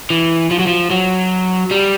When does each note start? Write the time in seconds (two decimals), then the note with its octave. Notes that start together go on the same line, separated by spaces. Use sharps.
0.10 E3
0.51 F3
0.59 F#3
0.67 F3
0.90 F#3
1.71 G3